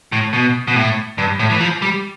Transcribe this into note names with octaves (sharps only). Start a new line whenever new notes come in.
A2
B2
B2
A2
G2
A2
E3
F3
G3